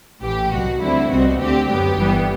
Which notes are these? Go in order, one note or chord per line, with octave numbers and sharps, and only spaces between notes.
A1 A2 E3 G4
C2 B2 F#3 F#4
D2 D3 G3 C4 E4
C2 B2 G3 C4 F#4
D2 D3 A3 C4 G4
F#2 F#3 B3 G4
G1 G2 E3 G3 B3